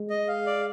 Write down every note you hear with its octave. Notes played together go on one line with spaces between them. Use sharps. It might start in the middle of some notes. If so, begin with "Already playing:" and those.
Already playing: G#3
D#5
F5
D5